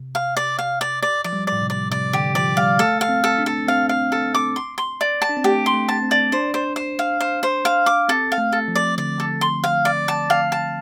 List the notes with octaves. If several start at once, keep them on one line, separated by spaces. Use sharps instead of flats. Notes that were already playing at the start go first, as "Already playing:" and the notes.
Already playing: C3
F5
D5
F5
D5
D5
F3 D5
G3
D5
A2
C3
D5
C3 D5
D3 G4
F3 D5
G3 F5
A3 A4
F5
C4
A4
D4
A4
C4 F5
F5
A4
D6
C6
C6
D5
A5
D4
C4
A3 G4
C6
A3
A5
C4
D5
D4 C5
C5
C5
F5
C5
C5
F5
D6
C4 A4
F5
A3
A4
F3
D5
D3 D5
A4
C6
F5
D5
A5
F5
A5